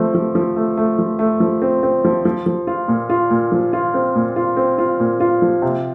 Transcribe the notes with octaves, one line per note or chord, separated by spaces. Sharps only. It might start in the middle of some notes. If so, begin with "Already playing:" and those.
Already playing: F3 A3 C4
F3
F3
A3
A3
F3
A3
F3
C4
C4
F3
F3
F3
F4
A#2
F4
A#2
F3
F4
C4
A#2
F4
C4
F4
A#2
F4
F3
C3